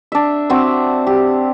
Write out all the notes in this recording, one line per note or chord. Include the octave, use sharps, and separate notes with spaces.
D4 E5
C4 F#4 E5
G4